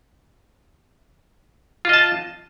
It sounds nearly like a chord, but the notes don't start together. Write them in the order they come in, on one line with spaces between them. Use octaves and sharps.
F4 D#5 A5